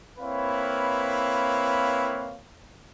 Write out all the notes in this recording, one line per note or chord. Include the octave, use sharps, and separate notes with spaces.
A#3 C4 E4 B4 C#5 F5